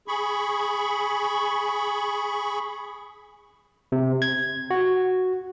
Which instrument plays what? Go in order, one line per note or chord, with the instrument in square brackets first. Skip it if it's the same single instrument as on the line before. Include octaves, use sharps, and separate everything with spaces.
[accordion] G#4 B5 C#6
[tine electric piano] C3
G#6
F#4